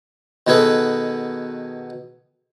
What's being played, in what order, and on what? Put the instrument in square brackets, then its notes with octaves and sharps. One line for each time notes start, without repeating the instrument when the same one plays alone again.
[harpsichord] B2 D#3 B3 G#4 A4 B4